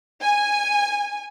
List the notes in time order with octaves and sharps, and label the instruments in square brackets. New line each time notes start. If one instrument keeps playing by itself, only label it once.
[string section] G#5